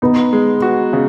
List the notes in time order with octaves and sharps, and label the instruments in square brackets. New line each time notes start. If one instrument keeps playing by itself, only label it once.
[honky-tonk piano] B3 [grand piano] D#4
[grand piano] G#3
F#4
C#3